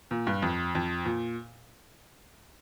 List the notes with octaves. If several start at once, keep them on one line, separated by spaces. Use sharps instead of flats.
A#2
G2
F2
F2
A#2